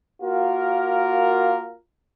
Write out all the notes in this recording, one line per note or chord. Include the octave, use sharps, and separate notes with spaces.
A#3 F4 F#4 A#4